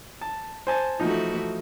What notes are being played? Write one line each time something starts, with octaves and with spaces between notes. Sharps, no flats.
A5
C5 G#5 A5
E3 F3 A3 D#4 F#4